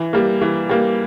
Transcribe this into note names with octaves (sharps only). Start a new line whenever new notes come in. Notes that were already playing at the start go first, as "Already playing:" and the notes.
Already playing: E3
G3 A#3
E3
G3 A#3